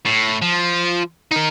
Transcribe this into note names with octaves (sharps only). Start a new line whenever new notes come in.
A2
F3
D#4 A#4